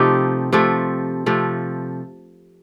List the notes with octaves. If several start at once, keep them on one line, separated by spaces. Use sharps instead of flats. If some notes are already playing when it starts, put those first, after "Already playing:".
Already playing: C3 F3 A3 D#4 G4
C3 F3 A3
C3 F3 A3